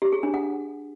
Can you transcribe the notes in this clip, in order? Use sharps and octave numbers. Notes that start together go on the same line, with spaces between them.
G4
G#4
D4
F#5